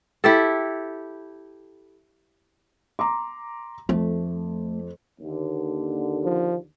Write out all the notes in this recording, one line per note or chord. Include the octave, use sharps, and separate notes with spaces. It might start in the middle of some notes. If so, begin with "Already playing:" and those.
E4 G4 A4
A#5 C6 D6
F2 A3
D#2 D3
F3